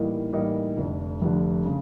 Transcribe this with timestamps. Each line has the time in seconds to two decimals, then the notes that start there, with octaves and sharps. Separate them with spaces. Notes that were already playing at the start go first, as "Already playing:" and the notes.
Already playing: A2 E3 G3 A#3 D#4
0.33 A2 E3 G3 A#3 D#4
0.77 F1 F2 D3
1.21 F1 F2 D3
1.65 C#3